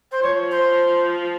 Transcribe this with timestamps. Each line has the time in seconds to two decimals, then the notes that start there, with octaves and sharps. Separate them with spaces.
0.11 C5
0.22 F3 C#5
0.51 C5